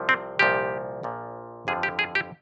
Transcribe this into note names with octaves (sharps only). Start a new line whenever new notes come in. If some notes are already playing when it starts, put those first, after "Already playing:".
Already playing: C2 C3 F3
C4
C2 A#2 F3 G4
A#1 A#2 F3
G1 F2 D3 F3 G#4
G4
G#4
G4